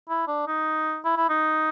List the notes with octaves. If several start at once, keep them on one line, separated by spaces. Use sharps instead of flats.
E4
D4
D#4
E4
E4
D#4